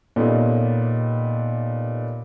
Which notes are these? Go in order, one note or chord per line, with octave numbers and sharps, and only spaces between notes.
A#2 B3 C#4 D#4 G4 A4